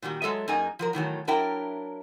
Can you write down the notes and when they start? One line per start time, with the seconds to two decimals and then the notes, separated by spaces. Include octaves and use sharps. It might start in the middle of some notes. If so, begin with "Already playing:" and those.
0.02 A#2 D#3 G3 F#4
0.22 F#3 G#3 A4 D#5 E5
0.48 F#2 A#3 D#4 G#4 G#5
0.79 F3 F#3 A#4
0.93 A2 D#3 E3 F#3
1.27 F#3 D4 E4 A#4 E5 G5